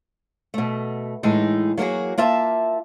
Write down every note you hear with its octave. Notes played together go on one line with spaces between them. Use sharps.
B2 A3
A2 E3 G#3 D#4
F#3 A#3 F#4 G#4
A#3 F4 E5 A5